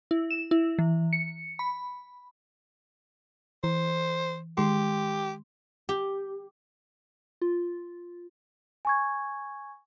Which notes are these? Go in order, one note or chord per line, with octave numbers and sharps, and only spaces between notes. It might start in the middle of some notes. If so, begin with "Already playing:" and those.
E4
E7
E4
E3
C#7
B5
E3 C5
D#3 G#3 G4 C6
G4
F4
G#5 C#6 G#6